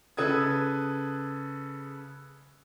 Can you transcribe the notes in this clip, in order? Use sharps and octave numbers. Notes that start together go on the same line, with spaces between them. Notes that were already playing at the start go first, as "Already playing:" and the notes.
C#3 A4 B4 D#6 G#6